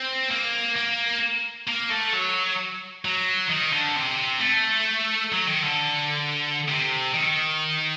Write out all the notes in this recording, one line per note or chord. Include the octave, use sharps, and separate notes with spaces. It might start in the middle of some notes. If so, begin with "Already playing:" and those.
Already playing: C4
A#3
A#3
A#3
A3
F#3
F#3
D#3
D3
C3
A3
F#3
D#3
D3
C3
D#3